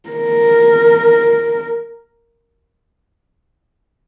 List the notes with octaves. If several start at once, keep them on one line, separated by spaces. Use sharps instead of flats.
A#4